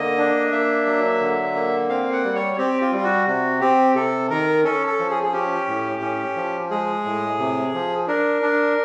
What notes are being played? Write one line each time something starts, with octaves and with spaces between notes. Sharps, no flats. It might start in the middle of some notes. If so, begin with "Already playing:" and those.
Already playing: D3 A#3 D#5
D4
A#3 E5
F#3
D3
A#3
C4 F5
F#5
G3
C#5
C4 G4
F4
G3
F4
F#4
C3 F#4
C4 G4
C3 A4
D#3 A#4
C#4 A4
A4
F3
G#4
G#4
C#4 G4
A2
C#4
F3
G#3 G#4
A2
C3
F3
D4 A#4
D4